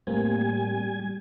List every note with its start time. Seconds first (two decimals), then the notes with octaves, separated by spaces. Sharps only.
0.07 A2 G3 A#3 C4 G#5